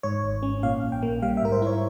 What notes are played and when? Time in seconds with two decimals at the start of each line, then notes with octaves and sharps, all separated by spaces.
0.03 G#2 C#5
0.23 G#1
0.43 C#4
0.63 A#2 F5
0.83 A#1
0.92 G5
1.03 A#3
1.22 G3 F5
1.37 E5
1.42 G#2 A#4
1.52 C5
1.62 E4 C#5